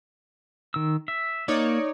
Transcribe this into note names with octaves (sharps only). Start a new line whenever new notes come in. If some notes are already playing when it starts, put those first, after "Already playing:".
D#3 E6
E5
A#3 D#4 C#5 D5